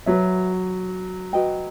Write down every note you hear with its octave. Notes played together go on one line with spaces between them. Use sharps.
F#3 F#4 B4 E5
F#4 B4 D#5 G5